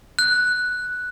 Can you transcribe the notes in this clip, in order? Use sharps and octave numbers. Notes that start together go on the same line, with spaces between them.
F#6